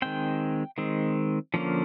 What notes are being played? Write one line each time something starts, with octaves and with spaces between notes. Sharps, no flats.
D#3 G#3 C4 G5
D#3 G#3 C4
D3 F3 A#3 C#4